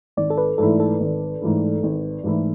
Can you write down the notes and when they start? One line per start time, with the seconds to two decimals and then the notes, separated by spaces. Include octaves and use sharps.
0.17 G#1 D5
0.30 A4
0.38 B4
0.58 G#2 E3 A3 E4 A4
0.80 A4
1.00 G#1
1.41 G#2 E3 A3 E4
1.83 G#1
2.24 G#2 E3 A3 E4